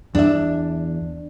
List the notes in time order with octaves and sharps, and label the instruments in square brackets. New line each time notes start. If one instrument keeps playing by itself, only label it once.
[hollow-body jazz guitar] E2 E5 [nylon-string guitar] D4